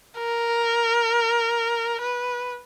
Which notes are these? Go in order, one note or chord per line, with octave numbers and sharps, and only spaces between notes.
A#4
B4